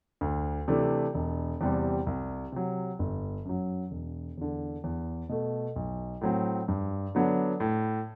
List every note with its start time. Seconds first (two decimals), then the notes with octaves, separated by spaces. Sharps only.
0.21 D2
0.68 C3 E3 A3 D4
1.14 E1
1.61 E2 C3 G3 C4
2.07 C2
2.52 C3 F#3
2.99 G1
3.45 F#2 F#3
3.91 E1
4.38 E2 D3
4.84 E2
5.29 B2 A3
5.76 B1
6.21 A2 F#3 C4
6.68 G2
7.15 D3 F#3 B3 D4
7.60 A2